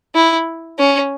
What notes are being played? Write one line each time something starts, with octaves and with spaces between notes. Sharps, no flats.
E4
C#4